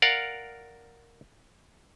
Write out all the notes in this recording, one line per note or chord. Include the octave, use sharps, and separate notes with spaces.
A#4 D5 F5 F#5